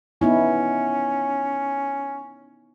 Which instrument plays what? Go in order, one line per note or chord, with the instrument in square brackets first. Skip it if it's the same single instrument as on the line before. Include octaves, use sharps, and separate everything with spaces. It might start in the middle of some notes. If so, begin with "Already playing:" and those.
[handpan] B3 D#4 E4 [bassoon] C#4